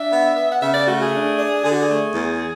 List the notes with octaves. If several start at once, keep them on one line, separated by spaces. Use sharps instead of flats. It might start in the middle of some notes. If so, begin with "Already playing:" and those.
Already playing: D4 E5
B3
B3
F#5
C#3 E5
D5
A3 F#4
G#4
D4
D4
D3 G#4
F#4
G#4
A3
E2